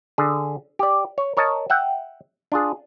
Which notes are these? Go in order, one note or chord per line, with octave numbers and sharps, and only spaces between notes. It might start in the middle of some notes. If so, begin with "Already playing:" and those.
D3 G#4
G4 D5
C#5
A#4 C#5 D#5 A5
E5 F#5 G5
D4 F4 G#4